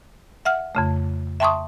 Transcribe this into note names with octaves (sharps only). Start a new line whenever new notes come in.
E5 F#5 F6
F2 C#3 A3
E5 G5 A5 C6 C#6 D#6